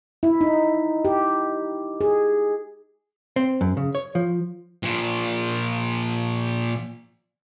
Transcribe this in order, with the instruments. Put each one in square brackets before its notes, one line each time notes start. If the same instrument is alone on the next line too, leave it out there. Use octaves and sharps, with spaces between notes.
[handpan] E4
D#4
G4
G#4
[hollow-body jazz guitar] C4
F#2
C#3
C#5
F3
[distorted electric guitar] A#2 F3